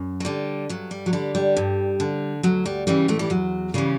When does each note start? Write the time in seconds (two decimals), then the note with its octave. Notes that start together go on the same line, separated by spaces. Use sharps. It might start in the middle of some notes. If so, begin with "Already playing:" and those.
Already playing: F#2
0.20 F#3
0.25 D3 G3
0.69 G2 F#3
0.91 G3
1.06 F#3
1.13 D3 G3
1.35 G3
1.57 G2
2.00 D3
2.43 D2 F#3
2.66 G3
2.87 C#3 E3 G3
3.08 A2 A3
3.19 G3
3.30 E2 F#3
3.74 C#3 E3 G3